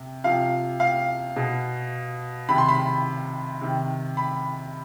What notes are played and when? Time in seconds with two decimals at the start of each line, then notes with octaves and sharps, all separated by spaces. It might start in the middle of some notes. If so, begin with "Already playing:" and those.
Already playing: C3
0.24 C3 F3 F5
0.80 F5
1.36 B2
2.49 C3 D#3 B5
2.58 C6
2.69 B5
3.61 C3 D#3
4.17 B5